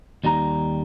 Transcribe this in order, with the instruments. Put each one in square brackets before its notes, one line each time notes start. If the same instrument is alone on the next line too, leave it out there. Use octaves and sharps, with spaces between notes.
[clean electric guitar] D#2 G3 D#4 A#5